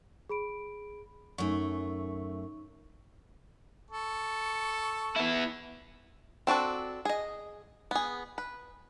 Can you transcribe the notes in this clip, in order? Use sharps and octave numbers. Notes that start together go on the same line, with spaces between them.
G#4 B5 D7
F#2 A3 D#4 C#6
A4 C#6
B3 E4
C4 D4 F#4 A4
G#4 D#5
B3 G#4
B4